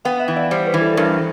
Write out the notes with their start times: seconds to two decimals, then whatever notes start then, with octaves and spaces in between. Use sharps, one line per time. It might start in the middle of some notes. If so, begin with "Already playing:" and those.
0.05 B3 F5 G5
0.20 E5 F#5
0.28 E3
0.36 D5 E5
0.51 G3 C5 D5
0.66 B4 C#5
0.74 E3
0.81 A4
0.93 A4
0.97 G2 A#4